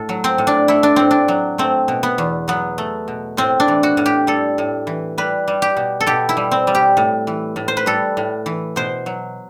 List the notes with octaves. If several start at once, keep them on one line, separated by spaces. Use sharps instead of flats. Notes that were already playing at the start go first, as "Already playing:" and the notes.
Already playing: A2 A4
F#3
C4
A2
D4
A3 E4
D4
A2 C4
D4
F#3
A3 C4
B2
B3
E2
F#3 B3
A3
B2
A2 C4
D4
E3
F#4
A2
G4
G3 A4
A2
E3
G3 B4
G3
G4
B2
A4
B2 G4
E4
G3
C4
G3
G4
A2
E3
A2
C5
B4
G3 A4
A2
E3
B2 C5
F#3